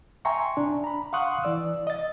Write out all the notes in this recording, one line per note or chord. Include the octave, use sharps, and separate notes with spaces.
E5 G5 G#5 A#5 C6 C#6
D4
A#5 B5
F5 F#5 C6 C#6 D#6 F#6
E3 D5 E6
D#5 A6